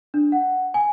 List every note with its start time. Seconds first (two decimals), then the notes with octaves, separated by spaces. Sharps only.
0.14 D4
0.32 F#5
0.74 G#5